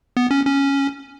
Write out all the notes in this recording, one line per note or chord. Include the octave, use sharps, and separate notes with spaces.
B3
C#4
C#4